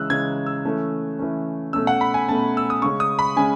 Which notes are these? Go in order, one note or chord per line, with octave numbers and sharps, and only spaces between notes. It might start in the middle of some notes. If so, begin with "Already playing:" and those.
Already playing: C#3 E3 G#3 C#4 E6 F#6
C#3 E3 G#3 C#4 G#6
E6
E3 A3 C#4
E3 A3 C#4
B2 A3 C#4 E6
F#5
B5
G#5
B2 A3 C#4 A5
E6
D#6
C#3 G#3 C#4 C#6
D#6
B5
C#3 G#3 C#4 G#5